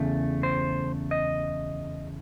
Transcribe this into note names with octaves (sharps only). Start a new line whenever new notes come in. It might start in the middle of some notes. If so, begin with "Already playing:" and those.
Already playing: E2 C#3 A3
C5
D#5